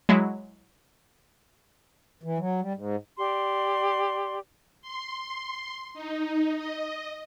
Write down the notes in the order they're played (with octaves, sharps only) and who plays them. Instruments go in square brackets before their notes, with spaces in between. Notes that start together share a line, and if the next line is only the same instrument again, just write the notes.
[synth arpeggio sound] F#3 G#3 E4
[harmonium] E3
F#3
G3
G#2
[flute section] G4 D5 C6
[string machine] C6
D#4
D#5